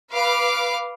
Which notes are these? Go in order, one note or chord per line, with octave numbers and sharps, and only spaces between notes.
B4 F5 D6